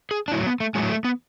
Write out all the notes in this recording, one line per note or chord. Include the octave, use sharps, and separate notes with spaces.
G#4
D4
A2 F#3 E4
B3
A3
A2 F#3 G#3
A3
B3